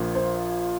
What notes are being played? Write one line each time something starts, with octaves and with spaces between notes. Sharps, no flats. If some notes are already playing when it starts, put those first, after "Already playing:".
Already playing: A#1 A#2 F3 A#3
C5